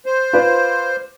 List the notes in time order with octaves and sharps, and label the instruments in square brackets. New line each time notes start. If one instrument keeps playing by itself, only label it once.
[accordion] C5
[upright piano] F4 B4 D5